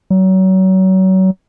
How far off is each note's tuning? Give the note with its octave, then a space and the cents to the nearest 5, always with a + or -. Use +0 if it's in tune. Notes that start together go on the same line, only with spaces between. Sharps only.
F#3 +30